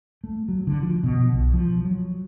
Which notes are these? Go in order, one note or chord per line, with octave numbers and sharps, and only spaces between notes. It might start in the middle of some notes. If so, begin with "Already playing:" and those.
A3
F#3
D3
F3
B2
B1
F3
F#3